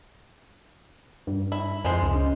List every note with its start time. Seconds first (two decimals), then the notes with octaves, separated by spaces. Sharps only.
1.27 G2
1.52 E4
1.85 F2 G#3 C5
2.02 C#2
2.14 C#4